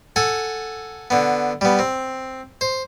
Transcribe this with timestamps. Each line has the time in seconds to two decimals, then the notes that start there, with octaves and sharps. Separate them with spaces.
0.16 A4 F#5 G#5
1.10 D3 B3
1.61 G3 B3
1.79 C4
2.61 C5